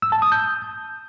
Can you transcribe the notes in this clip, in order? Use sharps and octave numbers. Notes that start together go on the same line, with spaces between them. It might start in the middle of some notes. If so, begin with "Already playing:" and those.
E6
A5
D#6
G6